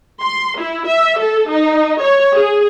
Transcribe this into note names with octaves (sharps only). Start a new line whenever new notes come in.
C6
E4
E5
A4
D#4
C#5
G#4